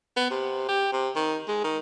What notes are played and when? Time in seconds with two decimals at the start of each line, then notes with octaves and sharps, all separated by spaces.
0.17 B3
0.31 C3
0.68 G4
0.93 C3
1.16 D#3
1.48 G#3
1.64 D#3